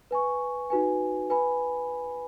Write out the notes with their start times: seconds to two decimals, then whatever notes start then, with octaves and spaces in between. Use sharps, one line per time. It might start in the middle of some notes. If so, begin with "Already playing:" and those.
0.11 B4 G#5 C#6
0.70 D#4 F#4 B4 G#5
1.30 B4 G#5 B5